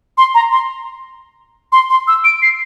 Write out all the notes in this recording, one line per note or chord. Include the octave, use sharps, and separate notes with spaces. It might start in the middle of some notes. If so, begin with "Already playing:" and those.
C6
A#5
C6
C6
C6
E6
D7
C7